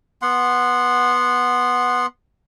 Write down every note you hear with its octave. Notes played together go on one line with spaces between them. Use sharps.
B3 F#5 C6